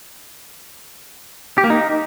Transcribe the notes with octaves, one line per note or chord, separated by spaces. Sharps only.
G4
A#3
D#4